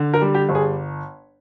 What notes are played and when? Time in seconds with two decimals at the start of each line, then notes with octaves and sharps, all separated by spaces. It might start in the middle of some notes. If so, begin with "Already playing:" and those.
Already playing: D3
0.13 A#4
0.21 G3
0.34 G4
0.49 G1
0.55 G#4